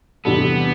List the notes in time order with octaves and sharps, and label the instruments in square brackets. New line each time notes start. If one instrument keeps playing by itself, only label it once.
[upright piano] E2 C3 G3 D4 A4 [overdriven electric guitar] B3